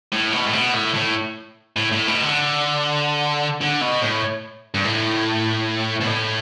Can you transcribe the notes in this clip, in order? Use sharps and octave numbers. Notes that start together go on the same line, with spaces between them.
A2
B2
A2
B2
A2
A2
A2
A2
B2
D3
D3
B2
A2
G2
A2
B2
A2